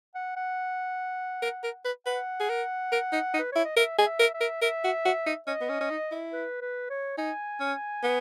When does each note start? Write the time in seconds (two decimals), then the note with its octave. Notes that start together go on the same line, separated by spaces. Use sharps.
0.15 F#5
0.36 F#5
1.42 A#4
1.63 A#4
1.85 B4
2.06 B4 F#5
2.40 G#4
2.49 A#4
2.92 A#4
3.13 D#4
3.34 D#4
3.39 B4
3.52 E4 C#5
3.65 D#5
3.77 A#4 E5
3.98 G#4 D#5
4.06 E5
4.19 A#4
4.34 E5
4.40 A#4
4.62 A#4 E5
4.84 F#4
5.05 F#4
5.27 D#4
5.47 C#4 D#5
5.61 B3
5.69 C#4
5.81 C#4
5.90 D#4
6.12 E4
6.33 B4
6.61 B4
6.90 C#5
7.18 D#4 G#5
7.60 C#4
8.03 B3